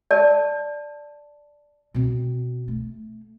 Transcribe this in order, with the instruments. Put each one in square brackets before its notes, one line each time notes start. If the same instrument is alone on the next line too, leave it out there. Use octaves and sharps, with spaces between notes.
[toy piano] D5 A5
[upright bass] B2 C4
A3